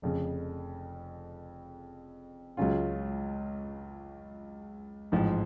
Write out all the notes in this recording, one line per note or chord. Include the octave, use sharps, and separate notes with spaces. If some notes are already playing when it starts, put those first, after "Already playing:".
F1 F2 C#3
C#2 C#3 F#3 C#4 F4
A1 G#2 F3